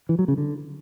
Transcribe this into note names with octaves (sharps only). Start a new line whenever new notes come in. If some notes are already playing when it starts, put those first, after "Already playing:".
E3
F#3
C#3
D3